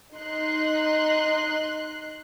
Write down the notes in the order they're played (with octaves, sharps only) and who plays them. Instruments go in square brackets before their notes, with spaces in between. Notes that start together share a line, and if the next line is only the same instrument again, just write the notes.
[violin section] D#4 C6 F#6